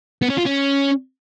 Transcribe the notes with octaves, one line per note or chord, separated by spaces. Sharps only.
B3
C#4
F4
C#4